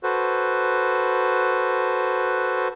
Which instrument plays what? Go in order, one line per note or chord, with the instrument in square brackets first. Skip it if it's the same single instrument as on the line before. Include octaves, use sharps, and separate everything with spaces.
[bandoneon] F#4 A4 B4 C5